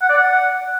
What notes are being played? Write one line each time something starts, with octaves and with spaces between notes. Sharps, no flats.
F#5
D5
F#5